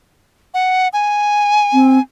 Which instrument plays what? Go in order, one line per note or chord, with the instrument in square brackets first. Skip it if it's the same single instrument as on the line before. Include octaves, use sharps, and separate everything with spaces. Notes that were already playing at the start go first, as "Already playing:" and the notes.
[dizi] F#5
G#5
[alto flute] C4